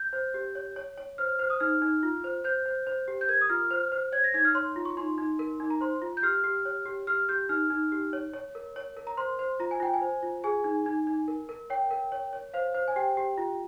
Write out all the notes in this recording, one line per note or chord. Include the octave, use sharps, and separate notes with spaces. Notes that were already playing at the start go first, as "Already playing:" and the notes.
Already playing: G6
C5
G4
C#5
C#5
C#5
C5 F6
C5
D#6
D#4 F6
D#4
F4
C5
C5 G6
C5
C5
G4
G6
A#4 G#6
D#6
F4 F6
C5
C5
C#5 G#6
A#6
D#4 G#6
F6
C#5 C6
F4
C#6
D#4 C6
D#4
A#4
D#4
A#5
C5 C6
F4
G6
G4 F6
G4
C#5
G4
G4 F6
G4 G6
D#4 F6
D#4
G4
C#5
C#5
A#4
C#5
A#4
A#5
C5 C6
C5
F4 A#5
G#5
F4 G5
G#5
C5
F4
G#4 G#5
D#4
D#4
D#4
A#4
A#4
C#5 G5
A#4
C#5
C#5
C5 F5
C5
G#5
G4 G5
G4
F4